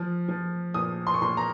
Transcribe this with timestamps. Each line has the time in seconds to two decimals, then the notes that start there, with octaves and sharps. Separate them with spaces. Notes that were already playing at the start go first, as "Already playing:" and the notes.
Already playing: F3
0.29 F3
0.74 A#2 D#6
1.07 C6
1.14 C#6
1.22 A#2 C6
1.37 A#5